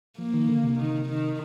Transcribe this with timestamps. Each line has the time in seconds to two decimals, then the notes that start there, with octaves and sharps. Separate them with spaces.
0.19 F3 A#3
0.34 D#3
0.49 D3
0.64 C3
0.79 D#3
1.08 D#3